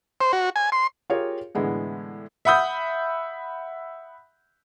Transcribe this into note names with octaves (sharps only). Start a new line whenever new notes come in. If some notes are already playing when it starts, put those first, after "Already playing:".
C5
F#4
G#5
C6
F4 G4 G#4 A#4 C#5 F5
A2 D3 E3 G#3 B3
E5 F#5 B5 D#6 G6